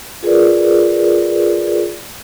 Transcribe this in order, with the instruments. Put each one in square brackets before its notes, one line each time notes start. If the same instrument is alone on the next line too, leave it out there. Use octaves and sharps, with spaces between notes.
[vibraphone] F4 G#4 A#4 B4 D5